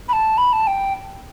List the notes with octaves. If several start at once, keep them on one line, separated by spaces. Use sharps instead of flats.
B5
A5
B5
A5
G5